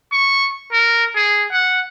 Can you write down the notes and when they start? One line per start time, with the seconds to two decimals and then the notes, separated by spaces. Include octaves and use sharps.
0.12 C#6
0.72 A#4
1.16 G#4
1.52 F#5